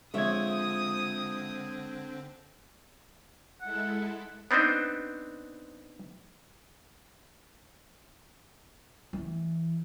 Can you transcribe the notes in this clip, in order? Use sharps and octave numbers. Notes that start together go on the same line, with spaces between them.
D3 F3 G#3 C4 C#5 E5 D#6 G#6
G#3 E4 A4 F#5
B3 C4 D4 D#4 C5
E3